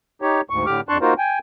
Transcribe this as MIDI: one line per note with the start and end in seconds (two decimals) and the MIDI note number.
0.22 0.41 63
0.22 0.41 67
0.22 0.41 73
0.50 0.66 38
0.50 0.66 44
0.50 0.66 85
0.66 0.81 45
0.66 0.81 50
0.66 0.81 67
0.66 0.81 86
0.66 0.81 89
0.89 0.98 41
0.89 0.98 62
0.89 0.98 81
0.89 0.98 84
0.89 0.98 85
0.89 0.98 90
1.01 1.14 58
1.01 1.14 63
1.01 1.14 65
1.01 1.14 66
1.01 1.14 70
1.01 1.14 72
1.18 1.39 79
1.18 1.39 80